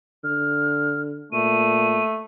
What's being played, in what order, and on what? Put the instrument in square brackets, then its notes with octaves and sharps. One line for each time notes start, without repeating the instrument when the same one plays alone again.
[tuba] D3 [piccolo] F6
[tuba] A#2 [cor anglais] A3 [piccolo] D#7